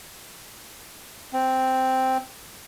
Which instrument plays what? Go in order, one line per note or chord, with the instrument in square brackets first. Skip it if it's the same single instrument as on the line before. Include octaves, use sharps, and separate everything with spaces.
[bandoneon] C4